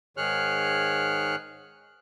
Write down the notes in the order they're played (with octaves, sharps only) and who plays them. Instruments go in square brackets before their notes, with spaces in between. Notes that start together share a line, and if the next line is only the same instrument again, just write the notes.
[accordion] G#2 D#3 G#4 C#5 F6 F#6